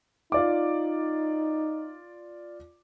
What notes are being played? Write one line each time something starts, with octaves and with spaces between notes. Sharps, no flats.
D#4 F4 D5 D6